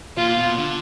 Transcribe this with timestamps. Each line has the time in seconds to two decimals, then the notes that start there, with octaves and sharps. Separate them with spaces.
0.17 A#2 F4
0.37 B2
0.57 D3